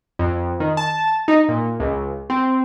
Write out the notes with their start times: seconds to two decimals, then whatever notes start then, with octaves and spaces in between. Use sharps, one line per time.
0.19 F2
0.60 D#3
0.77 A5
1.28 D#4
1.48 A#2
1.80 C#2
2.30 C4